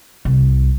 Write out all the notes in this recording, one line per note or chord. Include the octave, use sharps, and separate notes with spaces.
C2